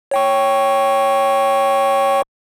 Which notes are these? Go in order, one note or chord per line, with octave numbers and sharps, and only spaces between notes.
C#5 G5 C#6